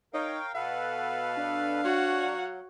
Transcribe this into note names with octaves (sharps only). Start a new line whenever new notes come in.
D#4 A#4 C#5 F5 G5
B2 A4 B4 F5 F#5
D4
F#4 C#5 F#5
F#3